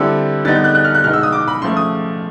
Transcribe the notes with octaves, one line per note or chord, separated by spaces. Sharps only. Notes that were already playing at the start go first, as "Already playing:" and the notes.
Already playing: D3 G3 C4 E4 A4
D3 G3 B3 D#4 A6
G6
F#6
F#6
F6
F#6
B2 G#3 B3 D#4 F6
E6
D#6
D6
B5
C#3 F3 A3 C6
D#6